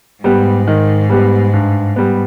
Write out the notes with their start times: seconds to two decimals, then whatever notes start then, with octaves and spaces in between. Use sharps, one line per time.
0.24 G#2 G3 B3 G4
0.67 D#3
1.10 G3 B3 G4
1.53 G2
1.96 G3 B3